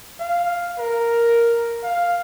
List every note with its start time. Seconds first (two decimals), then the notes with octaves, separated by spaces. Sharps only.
0.20 F5
0.79 A#4
1.83 F5